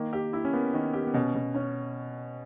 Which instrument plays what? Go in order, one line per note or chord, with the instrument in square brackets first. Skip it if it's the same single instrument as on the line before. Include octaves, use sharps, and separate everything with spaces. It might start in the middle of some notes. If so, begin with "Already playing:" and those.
Already playing: [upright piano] D#3 [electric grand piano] A#3
[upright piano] G4
E4
[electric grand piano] C#4
[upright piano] A#3 [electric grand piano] B3
[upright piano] D#3
G4
[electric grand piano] B3
[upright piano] B2 [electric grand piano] C#4
[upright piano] B2
C#4